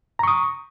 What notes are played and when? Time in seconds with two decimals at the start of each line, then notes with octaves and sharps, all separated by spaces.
0.19 A#5
0.23 C#6
0.28 D#6